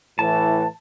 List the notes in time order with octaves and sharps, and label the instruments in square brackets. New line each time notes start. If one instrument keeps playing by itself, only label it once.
[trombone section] A2 E3 [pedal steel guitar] A5